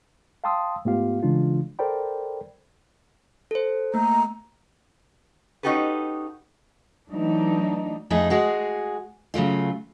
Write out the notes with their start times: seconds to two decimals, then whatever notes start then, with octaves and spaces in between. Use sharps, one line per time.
0.44 F5 G5 A5 C6 D#6 E6
0.85 G#2 A3 B3 F4 G4 F5
1.23 C#3 E3 G#3 D4 F4
1.79 A4 A#4 C5 D5 G5 B5
3.51 A4 C5
3.94 A3 A#3 A#5
5.63 C#4 D#4 F#4 G4 A4 B4
7.09 E3 F#3 A3 D4 D#4
8.10 F2 A3 C4 D#4 G#4
8.30 G#3 F#4 G#4
9.34 C#3 F#3 A3 F4